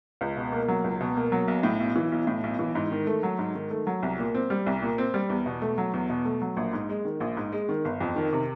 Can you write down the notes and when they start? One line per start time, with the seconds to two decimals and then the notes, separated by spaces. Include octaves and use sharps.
0.21 C#2
0.37 B2
0.52 A#3
0.68 F#3
0.84 C#2
1.00 B2
1.16 A#3
1.32 F#3
1.48 B1
1.63 A2
1.80 B1
1.96 E3
2.12 B1
2.27 A2
2.43 B1
2.59 E3
2.75 G#2
2.92 D#3
3.07 A3
3.23 F#3
3.39 G#2
3.55 D#3
3.71 A3
3.87 F#3
4.03 C2
4.19 A#2
4.35 C4
4.50 G3
4.66 C2
4.82 A#2
4.98 C4
5.14 G3
5.30 E2
5.46 B2
5.62 A3
5.78 F#3
5.94 E2
6.10 B2
6.25 A3
6.42 F#3
6.57 A#1
6.73 G#2
6.89 G#3
7.05 D#3
7.20 A#1
7.37 G#2
7.52 G#3
7.69 D#3
7.85 G1
8.01 F2
8.16 D#3
8.33 C3